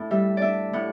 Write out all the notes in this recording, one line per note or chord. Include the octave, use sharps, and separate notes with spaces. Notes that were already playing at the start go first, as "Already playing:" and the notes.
Already playing: A2 D4
G3 E5
D4 D5 E5
A2 F#5